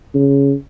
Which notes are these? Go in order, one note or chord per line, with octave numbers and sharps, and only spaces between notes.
C#3